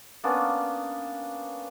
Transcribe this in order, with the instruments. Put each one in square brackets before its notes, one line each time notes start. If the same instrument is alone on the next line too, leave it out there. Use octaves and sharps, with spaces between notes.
[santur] A#3 B3 C#4 D4